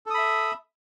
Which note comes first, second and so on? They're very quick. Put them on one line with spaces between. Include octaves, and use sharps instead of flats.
A4 D#6 B5 E5